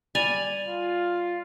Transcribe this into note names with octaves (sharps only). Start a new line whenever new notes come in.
G3 G#5 A6 F7 F#7
F4